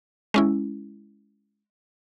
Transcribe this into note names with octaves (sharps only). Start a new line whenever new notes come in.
G#3 C#4 E4